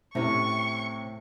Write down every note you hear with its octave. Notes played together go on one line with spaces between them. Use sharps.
A2 C3 A3 C4 C#4 E4 C#6